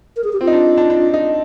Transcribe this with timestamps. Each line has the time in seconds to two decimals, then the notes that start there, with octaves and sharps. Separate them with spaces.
0.16 A#4
0.24 G#4
0.33 G4
0.41 C4 F4
0.47 D#4
0.53 D4
0.78 D4
0.90 D4
1.14 D#4